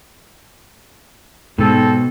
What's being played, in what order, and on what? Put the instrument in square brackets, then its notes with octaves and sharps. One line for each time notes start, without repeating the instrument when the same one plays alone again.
[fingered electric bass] G#2 [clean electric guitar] B2 [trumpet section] C4 A4